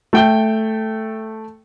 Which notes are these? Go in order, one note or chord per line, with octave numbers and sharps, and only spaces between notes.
A3 G5 G7